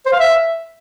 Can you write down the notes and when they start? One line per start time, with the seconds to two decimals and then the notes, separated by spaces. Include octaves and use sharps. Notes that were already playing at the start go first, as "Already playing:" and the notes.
0.06 C5
0.13 F5
0.20 E5